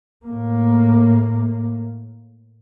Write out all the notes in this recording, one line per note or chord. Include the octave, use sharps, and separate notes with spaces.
A2 A#3